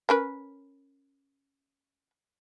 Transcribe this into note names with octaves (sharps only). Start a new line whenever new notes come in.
C#4 A#4 B4